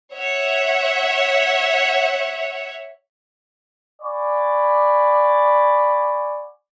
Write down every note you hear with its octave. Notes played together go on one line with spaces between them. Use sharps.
C#5 E5 F#5
D5 F#5 G#5 B5 C#6